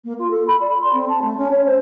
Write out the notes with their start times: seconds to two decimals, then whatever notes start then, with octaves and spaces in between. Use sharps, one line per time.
0.05 A#3
0.19 F4
0.31 A4
0.48 B5
0.61 D5
0.81 C6
0.93 C4
1.09 A5
1.22 A3
1.37 C#4
1.51 C#5
1.66 C5